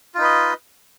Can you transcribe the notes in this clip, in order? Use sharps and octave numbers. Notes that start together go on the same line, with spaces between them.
D#4 F4 B4 D#5